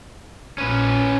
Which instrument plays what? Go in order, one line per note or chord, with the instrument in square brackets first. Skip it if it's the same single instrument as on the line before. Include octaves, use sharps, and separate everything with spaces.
[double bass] A#1 [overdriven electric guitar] C#4 B4